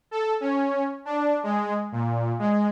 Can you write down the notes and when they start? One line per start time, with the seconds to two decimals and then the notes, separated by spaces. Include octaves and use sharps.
0.11 A4
0.40 C#4
1.05 D4
1.43 G#3
1.92 A#2
2.39 G#3